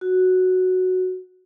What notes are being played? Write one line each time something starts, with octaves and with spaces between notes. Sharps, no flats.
F#4